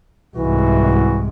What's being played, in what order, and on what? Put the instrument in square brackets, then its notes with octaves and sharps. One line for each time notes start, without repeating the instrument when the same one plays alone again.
[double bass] C2 G#2 [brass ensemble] E3 F#4